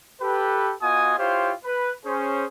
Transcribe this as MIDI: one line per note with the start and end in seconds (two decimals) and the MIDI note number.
0.21 0.73 67
0.21 0.73 69
0.21 0.73 71
0.82 1.14 59
0.82 1.14 65
0.82 1.14 66
0.82 1.14 75
0.82 1.14 80
0.82 1.14 87
1.18 1.53 64
1.18 1.53 65
1.18 1.53 67
1.18 1.53 72
1.18 1.53 73
1.18 1.53 77
1.65 1.92 71
2.05 2.46 61
2.05 2.46 68
2.05 2.46 72